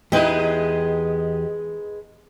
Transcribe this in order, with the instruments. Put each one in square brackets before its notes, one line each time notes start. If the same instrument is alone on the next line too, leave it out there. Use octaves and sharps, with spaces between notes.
[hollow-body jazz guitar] E2 E4 [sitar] G#3 D#4 B4 [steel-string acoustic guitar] G4 D#5